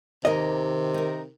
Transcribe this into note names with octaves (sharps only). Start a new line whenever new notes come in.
D#2 C3 D#3 A#4 D#5
D#4 A#4